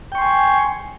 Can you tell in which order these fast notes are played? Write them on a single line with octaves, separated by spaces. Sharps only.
G5 C#6 C6 G#5